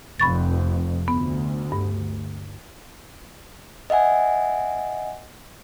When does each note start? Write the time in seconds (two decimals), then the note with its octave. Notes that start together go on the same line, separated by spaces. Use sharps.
0.20 F1 F2 B5 C#6 A6
1.08 D2 B3
1.72 G2
3.90 D#5 E5 F#5 G#5